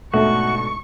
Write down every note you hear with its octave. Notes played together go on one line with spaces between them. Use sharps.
G#2 B2 A3 D4 F#4 C#6